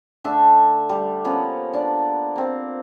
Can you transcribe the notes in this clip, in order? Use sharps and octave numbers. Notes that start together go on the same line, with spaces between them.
D3 A3 D4 E5
G3
F3 A#3 B3 C#4
D4 D5
A#3 C4